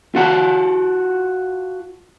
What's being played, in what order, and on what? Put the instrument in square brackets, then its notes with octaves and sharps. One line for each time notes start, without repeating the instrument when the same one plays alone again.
[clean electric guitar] F4 F#4 A5